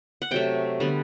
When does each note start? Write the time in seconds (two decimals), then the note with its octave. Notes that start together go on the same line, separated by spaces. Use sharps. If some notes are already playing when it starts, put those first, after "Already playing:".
0.22 F#5
0.31 C3 F#3 A3 G5
0.80 D3 G3 B3